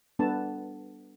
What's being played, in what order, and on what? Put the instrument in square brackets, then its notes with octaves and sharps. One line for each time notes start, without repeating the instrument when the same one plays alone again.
[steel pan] G3 B3 D4 A4 A5